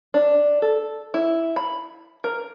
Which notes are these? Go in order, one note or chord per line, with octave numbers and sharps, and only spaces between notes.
D4
A4
E4
B5
A#4